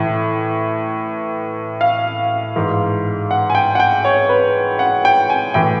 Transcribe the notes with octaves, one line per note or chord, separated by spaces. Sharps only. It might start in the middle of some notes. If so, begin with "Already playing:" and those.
Already playing: A2 E3
F5
G#2 E3
F#5
G#5
G5
F#5
G5
C#5
B4
F#5
G5
G#5
A2 E3 G5